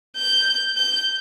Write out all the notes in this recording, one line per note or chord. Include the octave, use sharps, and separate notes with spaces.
G6
G6